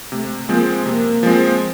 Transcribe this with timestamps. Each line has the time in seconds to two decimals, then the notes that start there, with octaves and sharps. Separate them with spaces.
0.12 C3 A3
0.49 F3 G#3 A#3 C4
0.86 C3 A#3
1.23 F3 G#3 C4